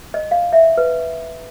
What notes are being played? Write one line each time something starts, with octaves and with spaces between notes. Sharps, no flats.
D#5
F5
E5
B4